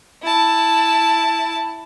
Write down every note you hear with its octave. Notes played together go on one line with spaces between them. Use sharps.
E4 A5